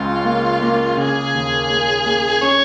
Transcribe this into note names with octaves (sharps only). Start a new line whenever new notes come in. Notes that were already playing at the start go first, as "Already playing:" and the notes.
Already playing: C#2 C#3 F4
A#3
A#3
C#3 G#4
D#2
A#3
A#3
C#4 C#5